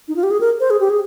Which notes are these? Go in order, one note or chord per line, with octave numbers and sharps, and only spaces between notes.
D#4
F4
G4
G#4
A#4
C5
G#4
G4
G#4